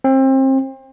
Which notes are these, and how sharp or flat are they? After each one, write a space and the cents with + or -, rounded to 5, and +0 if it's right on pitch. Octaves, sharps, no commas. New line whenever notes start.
C4 +30